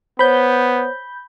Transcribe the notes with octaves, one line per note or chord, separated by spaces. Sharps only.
B3 C5 C#5 B5 G6